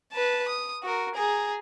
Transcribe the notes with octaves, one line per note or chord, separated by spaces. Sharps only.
B4 A5
D#6
F#4 A#4
G#4 A#5